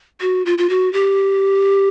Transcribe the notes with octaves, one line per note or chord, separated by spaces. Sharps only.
F#4
F4
F4
F#4
G4